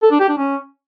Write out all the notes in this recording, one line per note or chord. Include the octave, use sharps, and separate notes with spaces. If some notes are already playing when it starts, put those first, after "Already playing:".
A4
D4
G4
D4
C#4